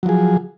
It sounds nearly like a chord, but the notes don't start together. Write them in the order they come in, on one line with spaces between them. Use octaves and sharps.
F#3 F3 G#4